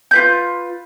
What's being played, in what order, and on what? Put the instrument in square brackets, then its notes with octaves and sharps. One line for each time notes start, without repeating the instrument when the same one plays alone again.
[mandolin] F4 B4 G6